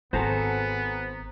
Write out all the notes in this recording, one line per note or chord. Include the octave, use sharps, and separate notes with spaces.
G#1 B3 F#4 G#4 A4 C5 A#5